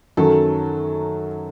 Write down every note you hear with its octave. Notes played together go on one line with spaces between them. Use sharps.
F#2 D#3 F#3 A4